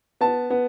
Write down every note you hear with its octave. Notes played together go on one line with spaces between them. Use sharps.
B3 A5
B3